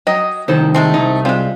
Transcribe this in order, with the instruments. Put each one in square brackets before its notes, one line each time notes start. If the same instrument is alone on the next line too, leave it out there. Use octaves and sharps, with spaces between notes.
[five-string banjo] F#3 G5 A#5 [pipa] D#5
[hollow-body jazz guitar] C2 D#3 [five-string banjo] D#4 A4 C5
[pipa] G#3 A3 C4
[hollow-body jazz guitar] C2 [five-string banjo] D#4
[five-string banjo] G3 C4 [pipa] G#3 F4